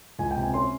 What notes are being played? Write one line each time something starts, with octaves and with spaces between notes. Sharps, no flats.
C#2 G#5
G5
C3
G#5
C#4 C6